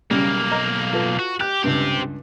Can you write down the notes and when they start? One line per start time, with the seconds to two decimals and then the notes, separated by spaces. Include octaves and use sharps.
0.11 B1 C#3 G3 A#3
0.51 D#5 A#5 F6
0.93 F4 A4 B4
1.19 F#4
1.41 G4 F#6
1.64 C#2 G2 C4 G4